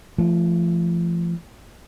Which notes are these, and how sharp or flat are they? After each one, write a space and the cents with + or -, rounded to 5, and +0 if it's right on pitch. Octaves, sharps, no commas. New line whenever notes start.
F3 -35 A3 +0